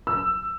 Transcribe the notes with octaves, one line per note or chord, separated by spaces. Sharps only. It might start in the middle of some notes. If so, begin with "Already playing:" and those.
E6